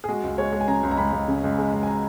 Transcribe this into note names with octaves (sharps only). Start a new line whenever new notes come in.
G#4
G#3 F#4
C#2
G#3 C#5
G#3
G#5
C#3 A#5
C#2
A#5
C#2 B5
C#2
C#3
C#2
G#3
C#2
G#5
A#5